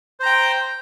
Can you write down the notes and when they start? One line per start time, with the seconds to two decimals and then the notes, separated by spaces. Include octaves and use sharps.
0.20 C5
0.23 A#5
0.26 G5